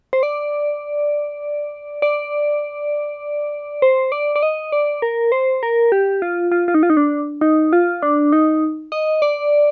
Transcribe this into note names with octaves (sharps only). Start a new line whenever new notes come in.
C5
D5
D5
C5
D5
D5
D#5
D5
A#4
C5
A#4
G4
F4
F4
F4
D#4
F4
D#4
D4
D#4
F4
D4
D#4
D#5
D5